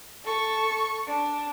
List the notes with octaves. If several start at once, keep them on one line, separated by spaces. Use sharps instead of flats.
A4 C#6
D4